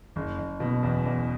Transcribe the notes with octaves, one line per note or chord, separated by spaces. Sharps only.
F#1
F#1
B2
E2
E2